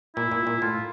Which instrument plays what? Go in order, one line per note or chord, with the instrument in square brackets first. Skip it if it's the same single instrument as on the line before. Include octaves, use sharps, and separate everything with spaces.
[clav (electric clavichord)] A#2 [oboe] E4
[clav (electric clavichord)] A#2
A#2
[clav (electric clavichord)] A2 [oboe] F4